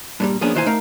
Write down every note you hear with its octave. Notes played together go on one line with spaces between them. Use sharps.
G2 A#2 G3
F3 A#3 B3 C#4 D4 G#4
A#2 D#3 E3 C5 F5 G#5
A3 D#4 A#4 F5